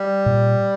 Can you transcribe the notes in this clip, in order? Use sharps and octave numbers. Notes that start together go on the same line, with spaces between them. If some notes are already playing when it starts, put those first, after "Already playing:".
Already playing: G3
A#2